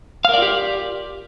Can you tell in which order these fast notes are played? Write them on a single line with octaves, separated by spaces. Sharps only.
F5 A#4 D5 F4 G4